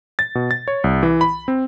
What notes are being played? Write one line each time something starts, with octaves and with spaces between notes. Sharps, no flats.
A6
B2
A6
C#5
C2
E3
B5
C4